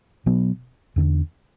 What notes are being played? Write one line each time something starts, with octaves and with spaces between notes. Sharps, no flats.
B2 F#3 B3
E2 D3 A3 D4